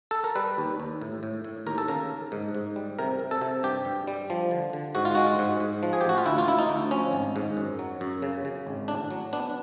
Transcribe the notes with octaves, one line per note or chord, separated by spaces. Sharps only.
A4
A#4
G3 B4
D#2
D#2
A2
A2
A2
D#2 A#4
A4
C#3 A#4
D#2
G#2
G#2
G3
C3 A#4
C3
A4
C3
G2 G4
G2
G3
F3
D3
D3
G#2 F#4
F4
G#3 F#4
G#2
G#2
F3
G#4
G4
A1 F#4
F4
D2 E4
F4
D2 E4
D#4
D2
F3 C#4
G#1
G#2
F#2
F#3
F#2
C#3
C#3
G#1
A2 D4
F#3
B3 D4